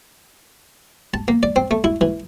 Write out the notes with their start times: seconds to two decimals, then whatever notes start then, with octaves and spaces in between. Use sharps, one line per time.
1.14 A5
1.28 A#3
1.43 D5
1.56 C4
1.71 A3
1.84 E4
2.01 E3